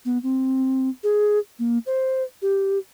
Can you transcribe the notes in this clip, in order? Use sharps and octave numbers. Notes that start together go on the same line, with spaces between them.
B3
C4
G#4
A#3
C5
G4